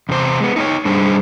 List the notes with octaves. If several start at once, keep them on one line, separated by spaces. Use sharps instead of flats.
E2 C3 C5
G#3 B3
D#4 C5 C#5
G2 G3 D4 G#4 C5